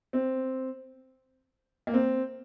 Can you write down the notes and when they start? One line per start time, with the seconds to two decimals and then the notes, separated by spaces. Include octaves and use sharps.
0.13 C4
1.87 A#3
1.94 C4